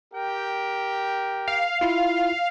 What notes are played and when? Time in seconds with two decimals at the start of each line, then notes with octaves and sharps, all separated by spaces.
0.13 G4 A#4 G5
1.48 F5 C7
1.81 E4 F4